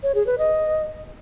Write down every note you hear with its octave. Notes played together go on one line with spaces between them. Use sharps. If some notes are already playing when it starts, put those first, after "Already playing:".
C#5
G#4
B4
D#5